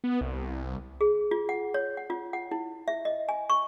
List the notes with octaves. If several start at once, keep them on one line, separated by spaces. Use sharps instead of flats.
B3
C2
G#4
F4
F#5
C#5
F#5
F4
F#5
E4
E5
D#5
G#5
C#6